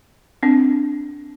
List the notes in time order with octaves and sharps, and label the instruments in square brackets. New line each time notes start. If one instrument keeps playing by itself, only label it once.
[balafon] C4 D4